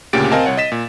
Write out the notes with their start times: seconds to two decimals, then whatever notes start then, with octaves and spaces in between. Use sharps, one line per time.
0.13 D2 A#2 C#3 G4 A6 D7
0.32 C4 A#4 D#5 F5 G#5 A5
0.46 C2 C#5 F#5
0.57 D#5 A6 B6 E7
0.72 A#2